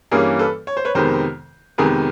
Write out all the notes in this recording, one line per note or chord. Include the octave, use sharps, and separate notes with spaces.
G2 E3 G3 A#3 C#4 G#4 A#4
A4 B4
C#5
C5
B4 C#5
F2 C3 D#3 G#3 B3 A#4 C5
F2 C3 D#3 G#3 B3 G#4 A#4